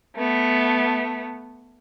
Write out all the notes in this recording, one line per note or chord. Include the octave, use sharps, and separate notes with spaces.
A3 B3